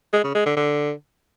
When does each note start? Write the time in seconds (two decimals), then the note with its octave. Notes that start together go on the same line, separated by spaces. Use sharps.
0.13 G#3
0.24 C#3
0.35 G#3
0.46 D3
0.56 D3